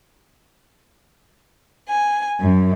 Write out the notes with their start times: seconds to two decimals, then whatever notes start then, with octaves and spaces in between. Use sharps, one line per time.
1.89 G#5
2.40 F#2